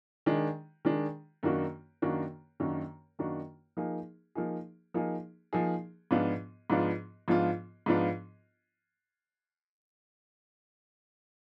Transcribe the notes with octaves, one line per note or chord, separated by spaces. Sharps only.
D#3 G#3 D4
D#3 G#3 D4
F#2 D#3 A#3 D4 F#4
F#2 D#3 A#3 D4 F#4
F#2 D#3 A#3 D4 F#4
F#2 D#3 A#3 D4 F#4
F3 A#3 D#4 G#4
F3 A#3 D#4 G#4
F3 A#3 D#4 G#4
F3 A#3 D#4 G#4
G#2 F3 B3 D4 F4
G#2 F3 B3 D4 F4
G#2 F3 B3 D4 F4
G#2 F3 B3 D4 F4